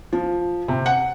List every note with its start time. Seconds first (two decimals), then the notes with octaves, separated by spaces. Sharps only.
0.13 F3
0.68 C3
0.86 F#5